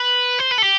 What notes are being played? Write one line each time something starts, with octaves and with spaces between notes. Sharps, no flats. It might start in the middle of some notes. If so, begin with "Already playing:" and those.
Already playing: B4
C5
B4
A4
G4